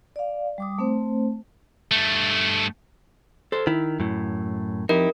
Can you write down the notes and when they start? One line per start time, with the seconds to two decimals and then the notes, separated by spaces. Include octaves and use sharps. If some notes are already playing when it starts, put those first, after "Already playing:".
0.16 D5 F5
0.58 G3 D6 D#6
0.78 A3 C4 C5
1.91 G2 A3
3.52 A4 C5
3.67 D#3 E4
4.00 F#2 A2
4.89 F2 D#4 E4 G4 A#4